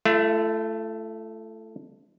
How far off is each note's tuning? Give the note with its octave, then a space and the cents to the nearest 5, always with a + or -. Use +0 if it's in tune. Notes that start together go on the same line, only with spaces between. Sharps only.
A3 +0 F4 -45